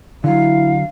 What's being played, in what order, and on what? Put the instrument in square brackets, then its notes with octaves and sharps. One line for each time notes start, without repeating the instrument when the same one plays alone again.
[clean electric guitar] D3 F#3 [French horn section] E4 [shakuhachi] F5